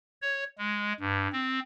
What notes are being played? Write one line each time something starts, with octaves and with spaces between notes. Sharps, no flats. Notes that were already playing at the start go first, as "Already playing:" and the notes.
C#5
G#3
G2
C4